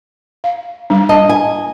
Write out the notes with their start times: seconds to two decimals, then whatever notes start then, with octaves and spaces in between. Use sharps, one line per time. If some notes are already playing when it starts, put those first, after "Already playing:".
0.44 F5
0.90 G3 D4
1.09 D#5 A5
1.29 G#5